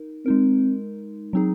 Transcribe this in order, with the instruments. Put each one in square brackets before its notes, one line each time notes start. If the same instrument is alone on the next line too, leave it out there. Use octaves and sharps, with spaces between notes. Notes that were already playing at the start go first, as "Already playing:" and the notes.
Already playing: [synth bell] D#4 A#4
[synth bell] G#3 D#4 A#4 [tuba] C4
[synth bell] F#3 C4 D#4 G#4